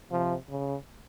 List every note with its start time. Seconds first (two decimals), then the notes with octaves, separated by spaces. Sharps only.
0.11 C3 F3
0.49 C#3